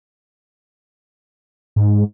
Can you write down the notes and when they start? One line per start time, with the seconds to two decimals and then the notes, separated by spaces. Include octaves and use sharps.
1.76 G#2